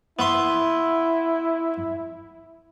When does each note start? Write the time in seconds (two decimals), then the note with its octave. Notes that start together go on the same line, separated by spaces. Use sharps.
0.19 B3 E4 E5 C6